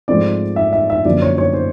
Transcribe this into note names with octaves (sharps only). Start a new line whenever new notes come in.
G#2 F3 A3 C4 D5
E5
E5
E5
F#2 D3 F3 A#3 D5
C#5
C#5
C5